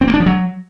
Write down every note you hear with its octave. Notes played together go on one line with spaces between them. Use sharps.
C4
A#3
D4
F3
F#3